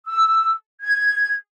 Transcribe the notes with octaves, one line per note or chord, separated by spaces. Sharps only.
E6
G#6